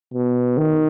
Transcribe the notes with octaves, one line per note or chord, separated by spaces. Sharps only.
B2
D#3